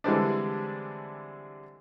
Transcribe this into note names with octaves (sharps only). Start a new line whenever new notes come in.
D3 E3 G3 G#3 C4 D4